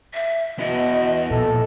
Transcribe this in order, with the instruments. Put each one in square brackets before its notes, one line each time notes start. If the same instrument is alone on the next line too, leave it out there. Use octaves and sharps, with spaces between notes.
[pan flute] E5
[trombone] B2 [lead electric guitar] B3 E4 [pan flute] D#5
[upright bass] A#2 F3 [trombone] A4